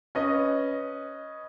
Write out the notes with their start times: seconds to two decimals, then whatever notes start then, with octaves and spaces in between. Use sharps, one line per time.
0.15 C#4 B4 D#5